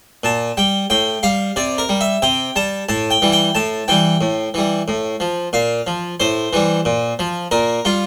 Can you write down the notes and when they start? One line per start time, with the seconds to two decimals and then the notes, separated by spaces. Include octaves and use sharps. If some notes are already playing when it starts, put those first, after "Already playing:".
0.24 A#2 A5
0.57 G3 G5
0.90 A2 G5
1.23 G3 F5
1.56 C3 D5
1.78 A#4
1.89 G3
2.01 E5
2.22 C3 G5
2.56 G3 A5
2.89 A2 A5
3.10 G5
3.22 E3 G3
3.32 G5
3.55 A2 A5
3.88 E3 G3 G5
4.21 A2
4.54 E3 G3
4.88 A2
5.20 F3
5.53 A#2 F5
5.87 F3
6.20 A2 C5
6.53 E3 G3
6.85 A#2
7.19 F3
7.51 A#2 A#4
7.85 G3 F4